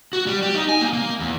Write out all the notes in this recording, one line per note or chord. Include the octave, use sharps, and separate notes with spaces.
F#4
G3
G4
D#4
G#5
A#3
A#3
E2